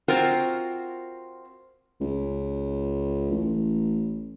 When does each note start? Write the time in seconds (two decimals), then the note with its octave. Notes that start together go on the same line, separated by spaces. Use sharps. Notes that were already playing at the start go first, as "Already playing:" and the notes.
0.08 C4 F4 F#4 A#4 C5
2.00 C#2
3.31 A1